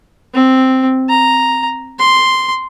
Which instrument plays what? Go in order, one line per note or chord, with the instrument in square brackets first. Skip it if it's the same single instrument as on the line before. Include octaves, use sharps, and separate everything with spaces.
[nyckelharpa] C4
A#5
C6